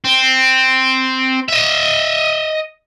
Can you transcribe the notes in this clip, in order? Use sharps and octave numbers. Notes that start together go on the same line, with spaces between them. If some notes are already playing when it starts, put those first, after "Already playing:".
C4
D#5 E5